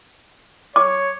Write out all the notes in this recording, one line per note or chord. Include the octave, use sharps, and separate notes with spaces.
C#5 D6